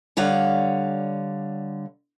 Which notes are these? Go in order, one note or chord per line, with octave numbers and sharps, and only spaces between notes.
D3 G3 C#5 F5 F#5